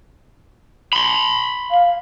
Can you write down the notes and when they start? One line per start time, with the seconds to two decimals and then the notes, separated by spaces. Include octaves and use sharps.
0.93 B5 C6
1.71 F5